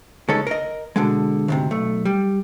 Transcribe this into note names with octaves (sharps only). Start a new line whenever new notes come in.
C#3 G#3 C#4 D#4 A4
A#4 D#5
B2 D3 G#3
D2 G#2 C3
B1 A3
G3